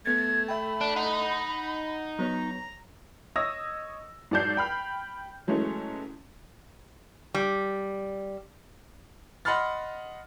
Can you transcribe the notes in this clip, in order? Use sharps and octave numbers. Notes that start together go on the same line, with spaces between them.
A3 B3 G#6 A6
E5 G5 B5
D4
D#4 F#5
F#3 B3 C#5 A#5
C#5 D#5 D#6 E6 A#6
G#2 F#3 D5 A5 G6 C7
G5 B5 F6
E3 F#3 G#3 A3 C#4
G3
D#5 F#5 B5 C6 F6 A6